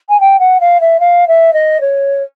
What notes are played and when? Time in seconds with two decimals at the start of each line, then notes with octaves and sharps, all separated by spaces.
0.09 G#5
0.20 G5
0.39 F#5
0.60 F5
0.81 E5
1.00 F5
1.28 E5
1.53 D#5
1.81 C#5